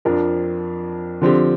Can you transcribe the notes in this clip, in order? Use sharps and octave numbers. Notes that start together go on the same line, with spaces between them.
F2 F3 D4 A#4
D3 F3 C4 G4